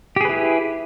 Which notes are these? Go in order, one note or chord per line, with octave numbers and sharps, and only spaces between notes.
E4 G4 G#4 B4